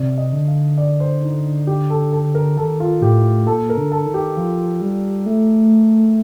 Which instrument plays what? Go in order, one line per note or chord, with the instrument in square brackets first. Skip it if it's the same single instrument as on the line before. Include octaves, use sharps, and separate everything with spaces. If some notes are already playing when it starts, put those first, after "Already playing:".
Already playing: [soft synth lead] C3 [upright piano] D5
[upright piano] D#5
[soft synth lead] D3
[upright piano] F5
D5
C5
D#4
G4
A4
A4
A#4
[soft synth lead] D#3 [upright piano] A4
[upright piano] F4
[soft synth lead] A2 [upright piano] G4
[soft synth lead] A#2 [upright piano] A4
[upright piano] A#4
[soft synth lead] D3
[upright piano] A4
[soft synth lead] D#3
[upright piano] G4
[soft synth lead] F3 [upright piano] F4
[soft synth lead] G3
A3